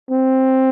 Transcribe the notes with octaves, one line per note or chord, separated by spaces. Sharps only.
C4